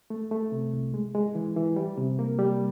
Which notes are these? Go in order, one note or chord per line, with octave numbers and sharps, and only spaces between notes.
A3
A3
C3
C2
G#3
G#3
E3
E3
G3
C3
A#3
G3